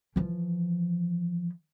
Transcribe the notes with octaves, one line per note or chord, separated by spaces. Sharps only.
E3 F3